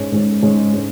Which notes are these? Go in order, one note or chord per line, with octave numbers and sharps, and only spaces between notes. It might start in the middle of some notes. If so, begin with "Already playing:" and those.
Already playing: G#2 G#3 C#4
G#2 G#3 C#4
G#2 G#3 C#4
G#3 C#4